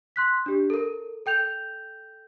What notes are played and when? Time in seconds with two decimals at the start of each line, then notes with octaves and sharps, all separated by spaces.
0.16 C6 F#6 B6
0.46 D4 G4
0.70 A4 A#4
1.26 A4 G5 G6 F7